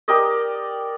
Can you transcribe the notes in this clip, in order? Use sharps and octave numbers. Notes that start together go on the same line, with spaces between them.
G4 A#4 D5 D#5